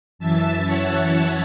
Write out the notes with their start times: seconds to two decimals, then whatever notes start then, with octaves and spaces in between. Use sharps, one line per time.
0.19 F#2 E3 E5 A5
0.65 C#5 F#5